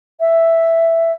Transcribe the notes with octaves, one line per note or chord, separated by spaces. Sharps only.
E5